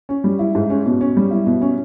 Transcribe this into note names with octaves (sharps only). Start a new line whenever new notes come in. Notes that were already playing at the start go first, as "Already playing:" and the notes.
C#4
G3
E4
G#2
C#4
B2
C#4
G3
E4
B2
C#4